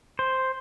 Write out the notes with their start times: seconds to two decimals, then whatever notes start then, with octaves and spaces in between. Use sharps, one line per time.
0.19 C5